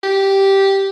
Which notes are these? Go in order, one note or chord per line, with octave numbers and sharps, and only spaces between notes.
G4